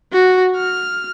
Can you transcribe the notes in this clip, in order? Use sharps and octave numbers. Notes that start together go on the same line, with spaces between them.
F#4
F6